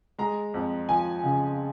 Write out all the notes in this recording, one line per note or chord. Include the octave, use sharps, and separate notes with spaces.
G#3 A#5
F2
F3 G#5
C#3